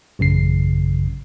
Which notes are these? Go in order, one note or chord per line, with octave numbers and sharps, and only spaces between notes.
A1 F#2 C#3 C7